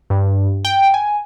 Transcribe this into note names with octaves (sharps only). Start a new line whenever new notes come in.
G2
G5
G#5